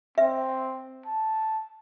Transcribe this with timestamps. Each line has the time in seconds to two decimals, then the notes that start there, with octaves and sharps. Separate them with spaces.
0.18 C4 E5
1.06 A5